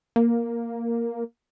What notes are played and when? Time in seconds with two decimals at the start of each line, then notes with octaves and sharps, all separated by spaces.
0.16 A#3